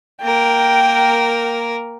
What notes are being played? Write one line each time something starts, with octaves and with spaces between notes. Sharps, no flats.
A#3 A#4 G5